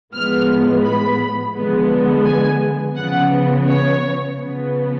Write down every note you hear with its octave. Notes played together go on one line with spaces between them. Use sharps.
A2 F3 G#3 B3 F6
B5
D3 F3 G#3 B3
G#5
C#3 F3 B3 F#5
C#5
C#3 F3 B3